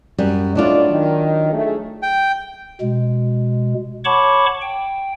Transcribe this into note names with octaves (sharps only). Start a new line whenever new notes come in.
F#2 G3
A2 F#3 D4 F4 D5 D#5
D#3
A3 D#4 G#4
G5
B2 G#3
C#5 F#5 A5 B5 C#6 D6
G5